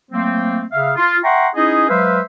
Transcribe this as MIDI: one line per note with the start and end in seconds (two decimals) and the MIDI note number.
0.12 0.64 54
0.12 0.64 57
0.12 0.64 58
0.12 0.64 60
0.72 0.92 49
0.72 0.92 76
0.72 0.92 77
0.97 1.18 65
1.24 1.48 76
1.24 1.48 78
1.24 1.48 79
1.24 1.48 82
1.24 1.48 84
1.24 1.48 85
1.56 1.87 61
1.56 1.87 63
1.56 1.87 64
1.56 1.87 68
1.56 1.87 75
1.89 2.20 54
1.89 2.20 56
1.89 2.20 71
1.89 2.20 72
1.89 2.20 76
1.89 2.20 77